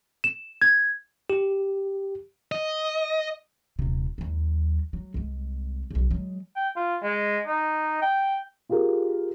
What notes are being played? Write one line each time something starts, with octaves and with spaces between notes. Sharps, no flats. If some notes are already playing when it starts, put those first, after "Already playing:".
E7
G#6
G4
D#5
D#1 C3
D#2 F#3
F#3
C2 G#3
B1 C#3
F#3 G#3
G5
F4
G#3
D#4
G5
F4 G4 G#4 A#4